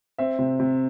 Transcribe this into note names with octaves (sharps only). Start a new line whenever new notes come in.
C4 E5
C3
C3